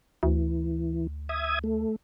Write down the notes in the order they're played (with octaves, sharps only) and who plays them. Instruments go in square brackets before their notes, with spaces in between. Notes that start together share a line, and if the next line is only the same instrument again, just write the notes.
[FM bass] D2 [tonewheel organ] E3
[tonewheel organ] E5 D#6 G#6
A3